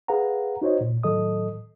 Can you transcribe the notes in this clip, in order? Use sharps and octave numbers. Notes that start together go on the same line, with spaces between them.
G#4 B4 F5 F#5 A#5
D#4 F#4 C5 C#5 D#5
A#2
A2 D#3 F#3 A4 D#5 D#6